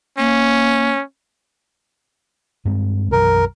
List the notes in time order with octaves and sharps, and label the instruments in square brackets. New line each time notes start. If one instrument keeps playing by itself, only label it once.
[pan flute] A#3 [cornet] C#4
[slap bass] G2 G#3 C4
[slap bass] B1 F#2 E3 [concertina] A#4